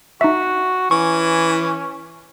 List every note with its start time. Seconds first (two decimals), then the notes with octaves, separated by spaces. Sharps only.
0.21 D#4 F#4 E5
0.91 E3 C#4 C#6